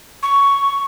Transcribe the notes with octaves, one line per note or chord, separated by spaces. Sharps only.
C#6